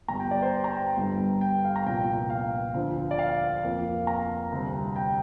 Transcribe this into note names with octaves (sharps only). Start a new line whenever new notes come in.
G1 G2 G3 A#5
G5
D5
C5
A#5
G5
G1 G2 G3
G5
F5
A#5
C2 A#2 F3 G5
F5
D2 D3 F3 C4
D5
F5
F2 F3 A#3
A#5
D2 C3 G3
G5